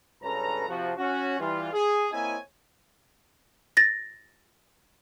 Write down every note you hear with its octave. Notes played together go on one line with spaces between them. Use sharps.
C#2 G2 C#4 A4 B4 A#5
C3 F3 F#4
C#4 F#4
E3 G3 F4
G#4
A#3 C4 E4 C#5 D#5 G#5
A6 A#6